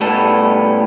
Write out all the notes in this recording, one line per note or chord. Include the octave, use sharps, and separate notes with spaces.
A2 G3 B3 A4